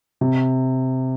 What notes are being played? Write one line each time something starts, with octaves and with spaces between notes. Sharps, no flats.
C3